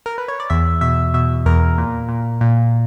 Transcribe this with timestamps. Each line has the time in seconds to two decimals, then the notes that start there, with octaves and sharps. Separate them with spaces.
0.06 A#4
0.18 B4
0.28 C#5
0.40 D5
0.50 E2 E5
0.81 B2 E5
1.14 B2 E5
1.46 E2 A#4
1.78 A#2
2.09 A#2
2.41 A#2